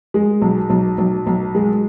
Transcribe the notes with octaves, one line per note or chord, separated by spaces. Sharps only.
G#3
B1
B1
B1
B1
G#3